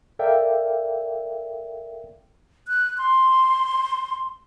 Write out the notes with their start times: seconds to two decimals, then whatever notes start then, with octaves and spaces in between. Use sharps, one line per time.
0.19 A4 A#4 D5 E5 F5 G5
2.68 F#6
2.98 C6